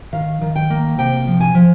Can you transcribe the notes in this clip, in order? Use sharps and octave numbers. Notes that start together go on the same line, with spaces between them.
D#3 F5
D#3
G5
A#3
C3 G5
F3
G#5
F3